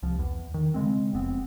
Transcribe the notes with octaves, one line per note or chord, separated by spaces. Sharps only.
C2 F3
E2
D#3
C#3 G#3 C4
F1 B3 C4